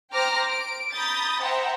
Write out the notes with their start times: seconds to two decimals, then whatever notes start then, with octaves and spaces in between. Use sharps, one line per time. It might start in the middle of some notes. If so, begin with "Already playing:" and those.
0.11 C5 G5 A#5 D6 F6 A#6
0.48 D7
0.91 A#5 B5 D#6 G6 A6
1.40 C5 E5 F#5 G5 A#5